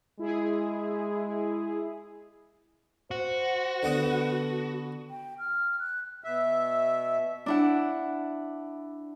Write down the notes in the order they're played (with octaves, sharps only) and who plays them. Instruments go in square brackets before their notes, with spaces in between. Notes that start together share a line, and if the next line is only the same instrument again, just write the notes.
[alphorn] G#3 [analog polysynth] E4 G#4
[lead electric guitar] F#4 [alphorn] C5
[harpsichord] D3 B3 D#6 [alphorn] A4
[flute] G5
F6
F#6
[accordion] B2 E5
[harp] D4 E4 F#5